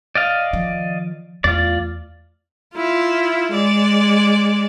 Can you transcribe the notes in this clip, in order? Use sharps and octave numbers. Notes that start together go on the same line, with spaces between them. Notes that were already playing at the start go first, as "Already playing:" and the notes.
D5 D#5 F5
D#3 F3
E2 A3 F4 D5
E4 F4
G#3 D5